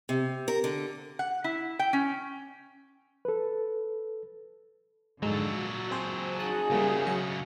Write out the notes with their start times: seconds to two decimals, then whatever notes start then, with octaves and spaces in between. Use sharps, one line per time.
0.09 C3
0.48 A#4
0.64 D3
1.19 F#5
1.44 E4
1.79 G5
1.93 C#4
3.25 A4 B4
5.23 F2 G#2 D3 F#3 G#3 A4
5.54 A#2 F#4
5.91 C4 G#4 C5
6.39 C#4 D#4 F#4 G#4 A5 D#6 F#6
6.71 C#3 G3 A3 A#3
7.07 F#3 D#5 C#7